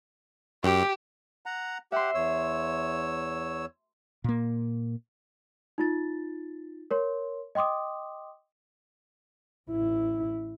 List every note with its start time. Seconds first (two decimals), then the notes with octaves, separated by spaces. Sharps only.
0.64 F#2 G4
1.46 F#5 A#5
1.92 G4 E5 F#5 C6
2.15 E2 C#5 E6
4.24 A#2 A#3
5.78 D#4 F4 A6
6.91 A#4 C#5 C6
7.55 D#5 G5 C6 D6 D#6
9.70 A1 E4